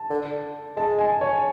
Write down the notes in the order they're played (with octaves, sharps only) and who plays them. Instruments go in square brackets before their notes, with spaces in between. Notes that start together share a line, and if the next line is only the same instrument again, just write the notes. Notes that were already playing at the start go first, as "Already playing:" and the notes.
Already playing: [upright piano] A5
[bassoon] D3
[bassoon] G#3 [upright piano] A5
[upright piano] G#5
C#5